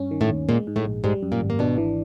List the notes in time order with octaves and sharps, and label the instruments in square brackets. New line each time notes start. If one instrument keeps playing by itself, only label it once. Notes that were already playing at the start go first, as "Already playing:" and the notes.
Already playing: [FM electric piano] G2 C#4
D#3
[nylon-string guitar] A2 A3
[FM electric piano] D#2
[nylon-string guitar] A#2 A#3 [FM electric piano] G#3
[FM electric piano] G#2
[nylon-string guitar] A2 A3
[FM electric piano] A#1
[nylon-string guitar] G#2 G#3 [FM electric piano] G3
[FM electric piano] F#2
[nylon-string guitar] A#2 A#3
[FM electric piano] G#1
[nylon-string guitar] A#3
[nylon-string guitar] B2 B3 [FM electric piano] D4
[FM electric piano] E3